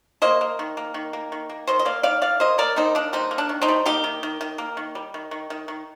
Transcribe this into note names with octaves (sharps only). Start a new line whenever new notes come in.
A#3 C5 D#5
A#3
D#3
A#3
D#3
A#3
D#3
A#3
D#3 C5 D#5
D#5
A#3 D5 F5
D#3 D5 F5
D#3 D5 F5
A#3 C5 D#5
A#3 A#4 D5
D#3 C4 D#4
A#3 D4
G3 C4 D#4
A#3
D4
D#3
C4 D#4
G3
A#3 D#4 G4
D#3
D#3
D#3
A#3
D#3
G3
D#3
D#3
D#3
D#3